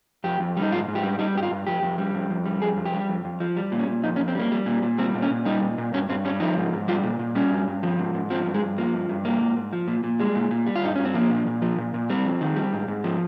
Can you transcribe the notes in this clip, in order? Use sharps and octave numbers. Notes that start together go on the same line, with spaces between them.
F2 G4
F2
G3
D#4
G#2 F4
G#2
G4
G3
G3 D#4
G2 G4
F4
G2
F2 G4
F2
G3
F2
F2
G3
F2 G#4
F2
G4
G3
F2
F2
F3
G3
A#2
C#4
A#2
F2 D#4
C#4
F2
C4
G3 A#3
G3
A#2
A#2
G3 C4
A#2
C#4
A#2
G3 D#4
A#2
A#2
G2 C#4
G2 C4
G3 C#4
F3 D#4
G#2
G#2
G3 F4
A#2
A#2
G3 C#4
G2
G2
F3
G#2
G#2
F3 C4
G2
G#3
G2
F3 A#3
G2
G2
G3 A#3
G#2
G#2
F3
A#2
A#2
G3 G#3
A#2
A#2
G3
F4
G2 D#4
G2 C#4
C4
F3 A#3
A#2
A#2
F3
A#2
A#2
G3 C4
F2
D#3
G3
G#2
G#2
F3